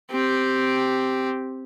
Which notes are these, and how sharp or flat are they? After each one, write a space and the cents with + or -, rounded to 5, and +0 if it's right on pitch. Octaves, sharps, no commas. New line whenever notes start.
C4 +0 G4 +0